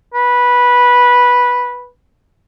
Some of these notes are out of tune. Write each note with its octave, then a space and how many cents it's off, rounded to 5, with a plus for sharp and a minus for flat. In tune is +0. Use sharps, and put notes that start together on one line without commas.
B4 -10